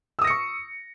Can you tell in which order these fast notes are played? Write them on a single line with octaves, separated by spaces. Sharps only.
E6 D#6 A#6 C#7 C#6